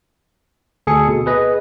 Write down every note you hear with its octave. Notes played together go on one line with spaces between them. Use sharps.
D2 G#4 A4 G#5 C#7
B2
G#4 B4 D#5